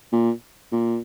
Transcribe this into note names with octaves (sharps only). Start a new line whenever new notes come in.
A#2
A#2